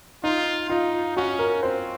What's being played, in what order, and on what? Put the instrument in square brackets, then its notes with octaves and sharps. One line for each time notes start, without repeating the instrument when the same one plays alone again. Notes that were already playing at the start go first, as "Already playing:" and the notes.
[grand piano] D#4 [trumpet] F4
[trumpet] D#4 [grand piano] F4
[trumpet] C#4 [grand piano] F#4
[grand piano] A#4
[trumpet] C4 [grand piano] C5